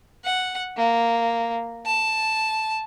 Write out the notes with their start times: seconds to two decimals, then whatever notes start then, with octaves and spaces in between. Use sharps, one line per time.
0.24 F#5
0.77 A#3
1.86 A5